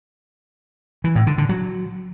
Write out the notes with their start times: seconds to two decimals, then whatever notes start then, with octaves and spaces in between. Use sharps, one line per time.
1.04 E3
1.15 A2
1.27 D3
1.38 D3
1.49 F#3